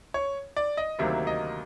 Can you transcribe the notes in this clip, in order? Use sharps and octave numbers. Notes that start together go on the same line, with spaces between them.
C#5
D5
D#5
D2 C3 D#3 F#3 A#3 E5
D#5